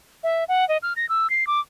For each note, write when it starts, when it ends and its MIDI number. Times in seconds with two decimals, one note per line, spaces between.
0.23 0.44 76
0.48 0.67 78
0.68 0.77 75
0.82 0.93 89
0.96 1.08 94
1.09 1.29 88
1.30 1.46 96
1.47 1.60 86